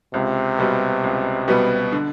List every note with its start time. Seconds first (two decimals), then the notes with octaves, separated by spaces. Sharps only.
0.14 C#2 C3
0.59 B2 G3 B3
1.04 C#2
1.48 B2 G3 B3
1.92 D3